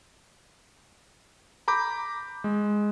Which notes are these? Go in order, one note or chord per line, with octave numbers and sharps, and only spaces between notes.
A#5 B5 D6 G6
G#3